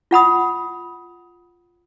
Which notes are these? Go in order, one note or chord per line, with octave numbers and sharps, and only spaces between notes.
F4 F#5 B5 D#6